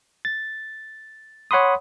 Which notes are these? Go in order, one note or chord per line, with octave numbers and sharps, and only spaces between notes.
A6
C#5 F#5 B5 C6 D#6